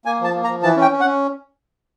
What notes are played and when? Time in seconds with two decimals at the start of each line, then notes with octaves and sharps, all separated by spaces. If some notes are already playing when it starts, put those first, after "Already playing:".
0.05 A#3 G#5
0.20 F3 A5
0.34 A#3
0.44 A#5
0.48 F3
0.63 E3 A5
0.76 C#4 G5
0.91 C#4
1.01 F#5
1.05 C#4